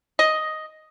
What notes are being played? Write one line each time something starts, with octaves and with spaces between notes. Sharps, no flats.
D#5